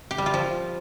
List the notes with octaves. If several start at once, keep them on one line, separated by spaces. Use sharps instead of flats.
G4
G3
F4
F3